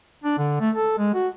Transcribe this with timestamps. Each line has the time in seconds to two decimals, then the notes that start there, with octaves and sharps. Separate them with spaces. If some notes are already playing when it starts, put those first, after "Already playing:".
0.24 D4
0.38 D3
0.61 A3
0.76 A4
0.98 G#3
1.14 F#4